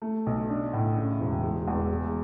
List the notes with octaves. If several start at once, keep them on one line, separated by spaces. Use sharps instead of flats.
A3
B1
D4
A2
C#3
E1
G#3
E2
G#3